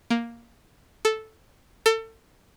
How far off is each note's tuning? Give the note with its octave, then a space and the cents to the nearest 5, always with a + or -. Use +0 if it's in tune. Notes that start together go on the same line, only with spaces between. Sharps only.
A#3 +5
A4 -5
A4 +30